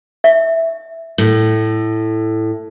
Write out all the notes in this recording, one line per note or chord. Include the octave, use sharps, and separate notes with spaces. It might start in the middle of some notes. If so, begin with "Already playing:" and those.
E5
A2